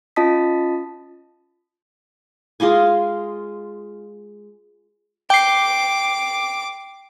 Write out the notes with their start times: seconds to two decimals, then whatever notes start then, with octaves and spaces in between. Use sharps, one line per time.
0.16 C#4 F4 D#5 A5 D#6 B6
2.60 G#3 F4 D#5 G#5
5.30 G5 D6 C7